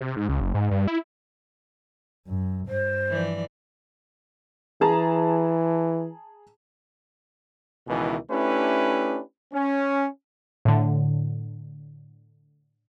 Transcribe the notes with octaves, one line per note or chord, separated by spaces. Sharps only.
C3
G#2
C#2
F#1
G#2
G2
E4
F#2
G2 C5
E3 F3 D5
E3 G#4 A5 A#5
C#2 B2 D#3 E3
A3 C#4 D4 E4 G4 B4
C#4
A2 D3